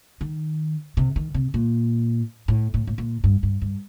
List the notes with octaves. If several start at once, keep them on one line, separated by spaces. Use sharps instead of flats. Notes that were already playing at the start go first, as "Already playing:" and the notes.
D#3
C3
D#3
C3
A#2
A2
A2
A2
A#2
G2
G2
G2